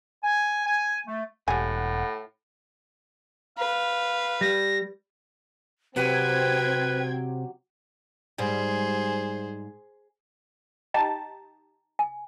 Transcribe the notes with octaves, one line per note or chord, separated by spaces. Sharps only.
G#5
G#5
A3
E1 A2 G4 F#5 G#5
B4 F5
G3 A#6
C3 F#3 C4 G4 B4 G5 G#6
G#2 G3 G#4 C5
D#4 G4 A5 A#5
G#5